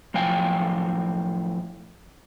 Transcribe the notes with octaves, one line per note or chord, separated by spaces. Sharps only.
A2 F3 F#3 F5 G5 G#5